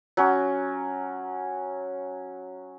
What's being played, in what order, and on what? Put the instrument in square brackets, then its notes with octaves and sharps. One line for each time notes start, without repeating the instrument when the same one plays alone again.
[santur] F#3 C#4